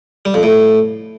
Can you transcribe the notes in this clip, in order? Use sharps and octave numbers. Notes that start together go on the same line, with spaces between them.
G3
F2
A2